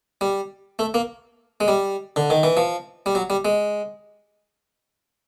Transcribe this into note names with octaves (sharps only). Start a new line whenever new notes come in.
G3
A3
A#3
G#3
G3
D3
D#3
E3
F3
G3
F#3
G3
G#3